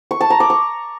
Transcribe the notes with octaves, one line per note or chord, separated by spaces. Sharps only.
C#6
A5
A#5
D6
C#6